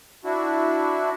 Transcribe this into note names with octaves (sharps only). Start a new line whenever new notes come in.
D4 E4 F#4